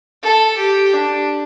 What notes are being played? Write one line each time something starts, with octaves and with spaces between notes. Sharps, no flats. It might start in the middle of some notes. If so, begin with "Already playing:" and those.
A4
G4
D4